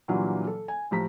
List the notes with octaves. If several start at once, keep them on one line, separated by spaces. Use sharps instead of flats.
A#2 D3 E3 F#3 G3 F4
A4
G#5
A2 F3 G4 A#5 B6